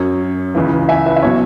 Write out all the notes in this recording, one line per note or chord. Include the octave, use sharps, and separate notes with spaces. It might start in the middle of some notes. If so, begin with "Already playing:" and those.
Already playing: F#2 F#3 C#5
C#2 C#3 E3
E5 G#5
B4 E5
E5
B2 F#3 C#5